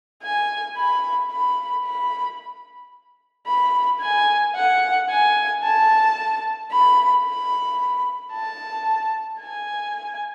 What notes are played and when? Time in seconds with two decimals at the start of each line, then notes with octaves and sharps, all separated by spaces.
0.23 G#5
0.77 B5
1.31 B5
1.86 B5
3.47 B5
4.01 G#5
4.56 F#5
5.10 G#5
5.64 A5
6.71 B5
7.25 B5
8.33 A5
9.41 G#5